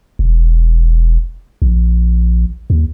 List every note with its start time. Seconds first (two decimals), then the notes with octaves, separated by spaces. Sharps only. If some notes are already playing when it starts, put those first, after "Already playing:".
0.19 E1
1.62 A#1
2.70 D#2